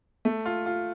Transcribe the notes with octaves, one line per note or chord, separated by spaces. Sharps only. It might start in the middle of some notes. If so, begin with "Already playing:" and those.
A3
F4
F4